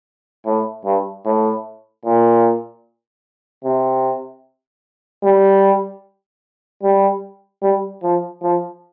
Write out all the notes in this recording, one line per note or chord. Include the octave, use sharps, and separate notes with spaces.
A2
G2
A2
A#2
C3
G3
G3
G3
F3
F3